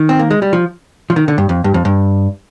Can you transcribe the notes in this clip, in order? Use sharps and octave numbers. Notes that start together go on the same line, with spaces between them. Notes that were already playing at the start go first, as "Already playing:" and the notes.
Already playing: D#3
C4
A#3
G#3
G3
F3
F3
D#3
D3
G2
F2
G2
F2
G2